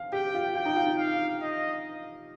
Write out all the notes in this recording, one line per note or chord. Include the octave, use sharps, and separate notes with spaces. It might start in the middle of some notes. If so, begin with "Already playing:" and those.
Already playing: F5
G4 G5
F4
F4 G5
D#4
F4
F5
D#5